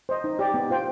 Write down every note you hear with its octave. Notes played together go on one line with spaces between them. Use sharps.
C5 D#5
D#4
G4 D5
B3
F4 C5 G5